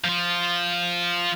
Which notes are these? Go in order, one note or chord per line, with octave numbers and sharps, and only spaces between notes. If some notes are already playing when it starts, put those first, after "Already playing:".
F3 F4